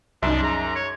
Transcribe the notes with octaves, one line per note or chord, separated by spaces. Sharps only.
C2 F#2 D4 D#4 E5
G#4 A#5
C#5